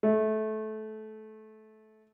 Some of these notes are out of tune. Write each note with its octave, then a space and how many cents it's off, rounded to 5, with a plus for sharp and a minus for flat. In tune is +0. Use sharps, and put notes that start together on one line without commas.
A3 -20